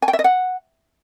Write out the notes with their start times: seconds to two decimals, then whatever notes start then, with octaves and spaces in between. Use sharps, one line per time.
0.02 G#5
0.08 G5
0.13 E5
0.19 D#5
0.24 F#5